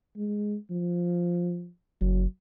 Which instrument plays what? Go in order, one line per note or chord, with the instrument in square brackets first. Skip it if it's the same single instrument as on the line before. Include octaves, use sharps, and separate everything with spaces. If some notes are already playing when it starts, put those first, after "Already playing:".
[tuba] G#3
F3
[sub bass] F#1 [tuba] F#3